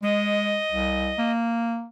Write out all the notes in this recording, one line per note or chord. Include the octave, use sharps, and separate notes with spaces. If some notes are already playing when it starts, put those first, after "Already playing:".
G#3 D#5
C2
A#3